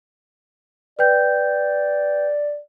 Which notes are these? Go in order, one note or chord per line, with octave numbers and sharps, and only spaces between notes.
B4 D5 G5 G6